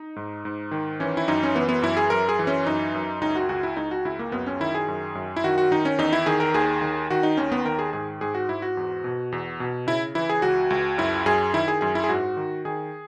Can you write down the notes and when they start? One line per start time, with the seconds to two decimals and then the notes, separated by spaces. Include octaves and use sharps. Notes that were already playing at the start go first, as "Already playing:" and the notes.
Already playing: D#4
0.16 G#2
0.45 G#2
0.71 D#3
1.00 E3 C#4
1.17 E4
1.28 F#2 D#4
1.43 C#4
1.55 E3 B3
1.69 B3
1.82 F#2 E4
1.97 G#4
2.10 F#2 A#4
2.29 G#4
2.39 E3
2.47 C#4
2.66 F#2 D#4
2.95 F#2
3.21 C#2 D#4
3.36 F#4
3.49 C#2 F#4
3.63 E4
3.77 C#2 D#4
3.91 F#4
4.05 C#2 E4
4.19 A#3
4.32 F#2 B3
4.46 C#4
4.60 D#3 E4
4.75 G#4
4.88 F#2
5.15 F#2
5.37 E4
5.44 D#3 F#4
5.58 F#4
5.71 D#3 D#4
5.85 C#4
5.98 E2 D#4
6.13 E4
6.26 D#3 G#4
6.40 A#4
6.54 D#2 G#4
6.82 D#3
7.10 D#3 F#4
7.23 D#4
7.37 D#2 C#4
7.52 B3
7.65 D#3 A#4
7.79 G#4
7.93 G#2 G#4
8.21 G#2 G#4
8.34 F#4
8.49 G#2 E4
8.62 F#4
8.77 E2
9.04 B2
9.32 E2
9.60 B2
9.87 C#3 E4
10.15 E3 E4
10.29 G#4
10.42 C#2 F#4
10.70 C#2
10.98 F#2 E4
11.26 F#2 G#4
11.53 D#3 E4
11.68 G#4
11.81 F#2 G#4
11.95 E4
12.04 G#4
12.09 G#2 F#4
12.37 D#3
12.65 D#3 G#4